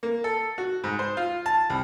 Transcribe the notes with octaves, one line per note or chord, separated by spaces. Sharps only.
A#3
A4
F#4
G#2
C5
F4
A5
C2